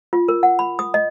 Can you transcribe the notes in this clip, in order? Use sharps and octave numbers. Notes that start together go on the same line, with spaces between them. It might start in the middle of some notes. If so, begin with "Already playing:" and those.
F4
A#4
F#5
B5
D#6
D#5